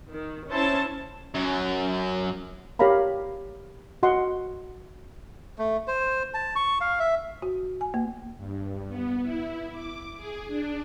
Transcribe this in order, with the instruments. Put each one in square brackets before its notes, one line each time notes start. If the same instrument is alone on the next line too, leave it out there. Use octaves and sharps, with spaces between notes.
[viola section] D#3
C#4 E4 C5 C#5 A5
[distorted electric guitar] F#2 F#3
[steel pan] G4 A#4 C#5 F5 A#5 B5
F#4 D#5 F#5 C6
[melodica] A3
C5
A5
C#6
F5
E5
[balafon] F#4
G#5
A#3
[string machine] G2
B3
E4
D6
G#4
D4